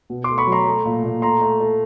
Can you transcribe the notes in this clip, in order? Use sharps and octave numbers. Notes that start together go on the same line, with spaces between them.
B2
C6 D6
A3
B5 C#6
F#3
A#5 C6
A3
A#2
A#2
A3 A#5 C6
A3
A3